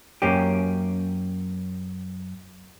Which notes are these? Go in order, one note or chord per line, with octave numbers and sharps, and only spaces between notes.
F#2 A#3 C#4 G4